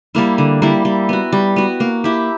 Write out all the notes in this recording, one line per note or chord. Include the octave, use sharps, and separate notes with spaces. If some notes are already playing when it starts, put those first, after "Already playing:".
G3 A#3 E4
D3
G3 A#3 E4
G3
B3 F#4
G3
B3 F#4
A#3
E4 G4